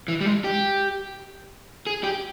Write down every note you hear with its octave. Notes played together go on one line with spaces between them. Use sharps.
E3
G3
G#3
G4
G#4
G4